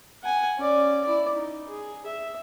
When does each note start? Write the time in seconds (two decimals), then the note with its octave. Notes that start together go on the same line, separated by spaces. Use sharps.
0.23 F#5 G#5
0.58 C#4 D5
1.04 E4 D5
1.34 D#4
1.69 G#4
2.05 E5